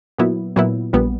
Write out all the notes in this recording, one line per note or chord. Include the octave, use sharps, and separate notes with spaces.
A#2 F#3 B3 E4
A#2 F#3 B3 E4
A#1 A#2 G3 B3